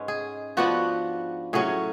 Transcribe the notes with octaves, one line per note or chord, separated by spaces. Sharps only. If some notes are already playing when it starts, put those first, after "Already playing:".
Already playing: G#2 G#3 C#4 B4
G#4
F3 B3 D4 F#4
A2 F#3 C#4 G#4